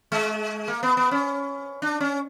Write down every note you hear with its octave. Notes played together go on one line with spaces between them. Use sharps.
G#3
A#3
B3
B3
C#4
D4
C#4